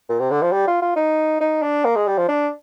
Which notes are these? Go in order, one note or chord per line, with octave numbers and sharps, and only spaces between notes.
A#2
C3
D3
F3
G3
F4
F4
D#4
D#4
D4
A#3
G#3
G3
F3
D4